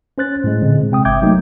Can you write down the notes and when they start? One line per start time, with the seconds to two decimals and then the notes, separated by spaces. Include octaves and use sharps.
0.18 C#4 C5 F#6 A6
0.44 A2 G#3
0.62 A#2 D3 G#3 C4
0.91 C3 C4 G5 D#6
1.05 G1 E5 G5 D6 G6 G#6
1.22 F#3 A3 A#3 D#4